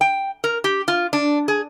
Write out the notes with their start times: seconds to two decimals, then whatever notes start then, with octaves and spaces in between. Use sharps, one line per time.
0.01 G5
0.44 A#4
0.64 G4
0.88 F4
1.13 D4
1.48 G#4